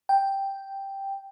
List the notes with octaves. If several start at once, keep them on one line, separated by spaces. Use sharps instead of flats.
G5